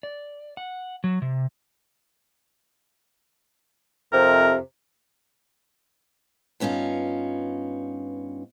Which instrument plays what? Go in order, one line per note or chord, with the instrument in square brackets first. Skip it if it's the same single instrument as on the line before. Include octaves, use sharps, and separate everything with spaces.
[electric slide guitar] D5
F#5
F#3
C3
[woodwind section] F2 C3 [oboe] A#4
[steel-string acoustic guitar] G2 B3 C#4 D#4 F4